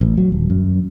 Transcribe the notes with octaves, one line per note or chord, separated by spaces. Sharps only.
A1
F#3
D#1
F#2